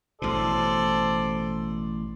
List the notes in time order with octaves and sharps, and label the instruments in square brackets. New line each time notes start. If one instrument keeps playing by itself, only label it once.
[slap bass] A1 B2 [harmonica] A4 C5 D5